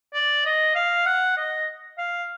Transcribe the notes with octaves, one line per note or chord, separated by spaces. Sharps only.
D5
D#5
F5
F#5
D#5
F5